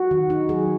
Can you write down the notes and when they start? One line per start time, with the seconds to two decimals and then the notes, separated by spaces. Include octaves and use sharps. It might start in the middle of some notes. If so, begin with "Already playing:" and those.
Already playing: F#4
0.11 D#3
0.30 D#4
0.49 F#3 G#4